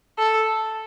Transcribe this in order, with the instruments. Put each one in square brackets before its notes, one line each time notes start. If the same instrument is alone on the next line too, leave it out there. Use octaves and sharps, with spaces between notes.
[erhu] A4